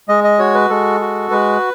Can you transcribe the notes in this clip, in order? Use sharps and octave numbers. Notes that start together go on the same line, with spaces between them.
G#3 D#5
D#5
F#4 C#5
B4
G#3 A4
F#4
G#3 B4